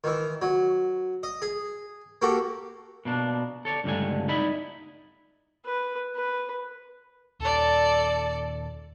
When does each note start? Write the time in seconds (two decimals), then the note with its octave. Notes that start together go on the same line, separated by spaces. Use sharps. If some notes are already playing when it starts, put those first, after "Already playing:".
0.04 D#3 E3
0.42 F#3
1.23 D#5
1.42 G#4
2.22 A#3 F#4 G4 A4
3.05 B2 A#3 D4
3.65 A4 C#5 D5
3.84 C#2 G2 D3 A3 G#5
4.28 D#4 E4 D5 D#5 B5
5.65 B4
6.16 B4
7.40 D#1 A4 D5